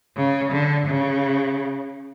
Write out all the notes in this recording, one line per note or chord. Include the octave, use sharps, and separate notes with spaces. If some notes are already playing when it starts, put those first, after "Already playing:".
C#3
D3
C#3